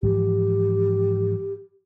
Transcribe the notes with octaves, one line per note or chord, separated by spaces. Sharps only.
G#2 E3 F3 G4